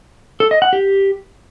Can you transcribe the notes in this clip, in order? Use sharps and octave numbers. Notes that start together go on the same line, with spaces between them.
A4
D#5
F#5
G4